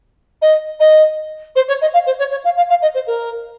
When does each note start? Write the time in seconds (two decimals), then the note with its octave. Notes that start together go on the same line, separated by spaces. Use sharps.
0.41 D#5
0.79 D#5
1.55 C5
1.68 C#5
1.81 D#5
1.93 F5
2.06 C5
2.18 C#5
2.30 C#5
2.44 F5
2.56 F5
2.69 F5
2.82 D#5
2.94 C5
3.07 A#4